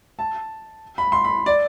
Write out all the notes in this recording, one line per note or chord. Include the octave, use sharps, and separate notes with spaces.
A5
B5
C6
B5
D5